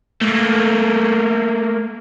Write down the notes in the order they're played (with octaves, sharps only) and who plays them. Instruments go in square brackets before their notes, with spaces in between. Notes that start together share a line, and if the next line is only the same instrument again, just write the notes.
[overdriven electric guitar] A3 A#3